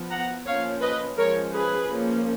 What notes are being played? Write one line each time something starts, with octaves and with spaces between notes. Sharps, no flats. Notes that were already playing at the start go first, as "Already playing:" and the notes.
Already playing: F3 B3
F#5 A#5
F3 A#3 C#4 C#5 F5
B4 D#5
F3 G#3 C#4 A#4 C#5
G#4 B4
F3 A#3 C#4